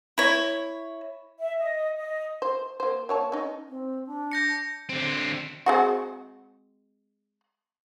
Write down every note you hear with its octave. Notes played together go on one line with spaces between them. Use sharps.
E4 C#5
E5
D#5
D#5
C5
A#3 C5
A#3 C#5 A5
C#4 D#4
C4
D4
G6 A#6 C#7
D3 C4
G#3 C4 F#4